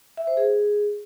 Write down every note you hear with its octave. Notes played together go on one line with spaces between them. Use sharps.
E5
C5
G#4